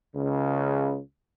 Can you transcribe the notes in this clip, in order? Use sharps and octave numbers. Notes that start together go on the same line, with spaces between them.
C#2 C#3